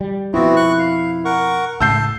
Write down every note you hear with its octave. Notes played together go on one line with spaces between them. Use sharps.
G3
F2 B2 F3 B3 C4 E4 F#4
C#6 F#6
F5
A#4 F#5 C#6
C#2 A2 A5 E6 G6 C7